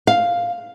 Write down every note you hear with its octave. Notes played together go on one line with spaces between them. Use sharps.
F5